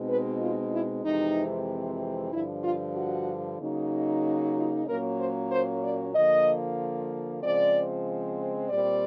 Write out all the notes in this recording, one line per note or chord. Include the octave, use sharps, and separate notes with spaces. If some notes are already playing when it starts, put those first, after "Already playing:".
Already playing: B2 G#3 C4 D#4
B4
F4
E4
F2 C3 E3 G#3 C4 D#4
G2 D3 F3 E4
F4
F#4
C#3 F#3 A#3 D#4
F4
A#2 F#3 A#3 C#4 A#4
C5
C5
D5
D3 F3 A#3 D#5
C#3 F3 G#3 C4 D5
A#2 G3 C4 D5